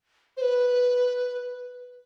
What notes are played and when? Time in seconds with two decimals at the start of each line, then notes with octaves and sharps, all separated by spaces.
0.37 C5
0.41 B4